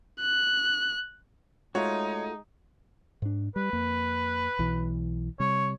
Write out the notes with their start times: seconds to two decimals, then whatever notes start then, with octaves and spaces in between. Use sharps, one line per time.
0.21 F#6
1.75 G#3 A3 D#4 F4 F#4 C#5
3.22 G#2 D4
3.56 G3 B4
3.73 F2 A#3
4.59 B1 E3
5.40 C3 G3 C#5